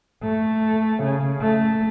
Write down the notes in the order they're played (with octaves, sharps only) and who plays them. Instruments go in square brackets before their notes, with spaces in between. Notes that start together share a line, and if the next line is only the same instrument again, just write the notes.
[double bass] A3
C#3
A3